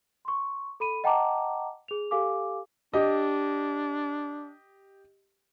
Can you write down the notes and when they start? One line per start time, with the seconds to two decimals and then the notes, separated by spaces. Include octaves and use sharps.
0.25 C6 C#6
0.80 A4 B5 D#7
1.04 D#5 F#5 G5 A5 A#5 D6
1.88 G#4 F7
2.11 G4 A4 F5 G#5 D6
2.94 D4 G4 D#5